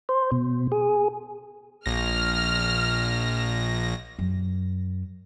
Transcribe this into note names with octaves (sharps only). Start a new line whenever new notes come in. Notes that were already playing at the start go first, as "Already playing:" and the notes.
C5
B2
G#4
A#1 F6 A#6
F#2